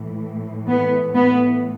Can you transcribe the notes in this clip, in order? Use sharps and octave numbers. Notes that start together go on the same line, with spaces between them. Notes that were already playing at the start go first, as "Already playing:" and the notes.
Already playing: A2 E3
B3
B3